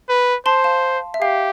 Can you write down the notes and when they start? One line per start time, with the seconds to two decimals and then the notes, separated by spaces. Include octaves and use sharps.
0.09 B4
0.46 C5 A5 C6
0.64 F5 A5
1.14 E5
1.21 G4 F5